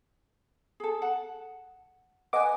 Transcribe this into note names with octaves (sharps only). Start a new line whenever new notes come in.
G#4 A4
F#5 A5
B4 D#5 F#5 G#5 D6